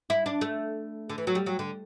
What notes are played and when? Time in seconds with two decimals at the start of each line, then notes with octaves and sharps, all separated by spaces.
0.10 E4
0.26 D4
0.41 A3
1.10 D3
1.18 E3
1.27 F#3
1.35 G3
1.46 F#3
1.59 D3